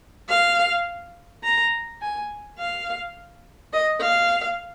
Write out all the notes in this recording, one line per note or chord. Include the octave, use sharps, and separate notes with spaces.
F5
A#5
G#5
F5
D#5
F5